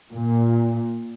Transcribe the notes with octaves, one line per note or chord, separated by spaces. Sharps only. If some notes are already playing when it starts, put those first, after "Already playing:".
A#2